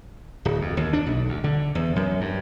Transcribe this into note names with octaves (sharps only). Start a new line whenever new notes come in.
D1
F2
D#2
D4
B1
D2
D3
E2
F#2
G2